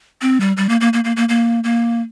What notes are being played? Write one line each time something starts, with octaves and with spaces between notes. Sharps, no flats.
C4
G3
G3
A#3
A#3
A#3
A#3
A#3
A#3
A#3